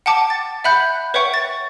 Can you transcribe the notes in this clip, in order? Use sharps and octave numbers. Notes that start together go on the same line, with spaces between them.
F#5 G5 A5 D6
A6
E5 F#5 B5 F#6 G6
B4 C#5 E5 F#5 G5 C#6
A6